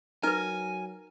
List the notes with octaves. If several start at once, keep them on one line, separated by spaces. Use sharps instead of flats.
F#3 D#4 A#4 B4 G#5